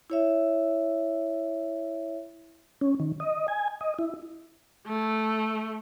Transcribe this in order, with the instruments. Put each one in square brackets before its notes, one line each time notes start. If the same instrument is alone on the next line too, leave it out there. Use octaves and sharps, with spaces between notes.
[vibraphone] E4 C#5 E5
[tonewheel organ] C#4
D#3
D#5
G#5
D#5
E4
[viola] A3